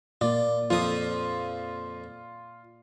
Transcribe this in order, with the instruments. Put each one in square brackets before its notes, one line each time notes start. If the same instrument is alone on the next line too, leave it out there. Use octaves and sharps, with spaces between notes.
[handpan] A#2 A#3 [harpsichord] F4 [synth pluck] D5
[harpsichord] F2 F3 D#6 [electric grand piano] F4